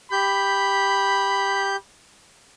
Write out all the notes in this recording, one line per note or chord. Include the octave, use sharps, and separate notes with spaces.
G4 B5 G6